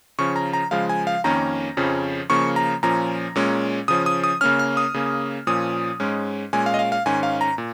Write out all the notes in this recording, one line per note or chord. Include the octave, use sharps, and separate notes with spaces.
C#3 F3 C#4 C#6
A#5
A#5
C#3 F3 G#3 F5
G#5
F5
F2 D#3 A#3 C#4 A#5
F2 C#3 F3 C#4
C#3 F3 A#3 C#4 C#6
A#5
A#2 F3 C#4 A#5
A#2 G#3 C#4
C#3 F3 C#4 D#6
D#6
D#6
C#3 A#3 C#4 F6
F6
D#6
C#3 A#3 C#4
A#2 F3 C#4 D#6
G#2 G#3 C#4
A#2 G#3 C#4 G#5
F5
D#5
F5
F5
G#2 D#3 C#4 G#5
F5
A#5
A#2